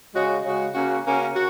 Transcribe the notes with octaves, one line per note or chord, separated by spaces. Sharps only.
C#3 G#3 F#4
C#3 G#3 F#4
C#3 A#3 C#4 F#4
C#3 A#3 C#4 F#4
F#4